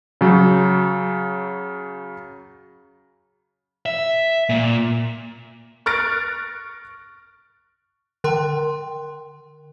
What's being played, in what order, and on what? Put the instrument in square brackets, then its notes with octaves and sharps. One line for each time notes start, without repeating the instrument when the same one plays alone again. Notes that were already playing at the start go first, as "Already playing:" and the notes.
[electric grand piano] C#3 F#3
[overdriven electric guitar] E5
A#2
[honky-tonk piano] C#6 F6 F#6 A6 A#6 D7
[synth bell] D3 A#4 G5 C6